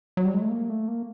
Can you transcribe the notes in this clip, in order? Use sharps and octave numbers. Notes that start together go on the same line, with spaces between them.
F#3
G3
G#3
A3
A#3
A3
A#3